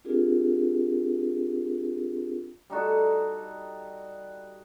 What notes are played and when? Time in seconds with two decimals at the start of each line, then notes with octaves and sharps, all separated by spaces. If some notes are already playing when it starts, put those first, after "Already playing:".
0.04 C4 D4 F4 G4 G#4 A#4
2.70 G3 D#4 F#4 A4